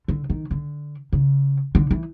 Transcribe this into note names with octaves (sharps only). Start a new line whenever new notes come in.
D3
D#3
D3
C#3
D3
E3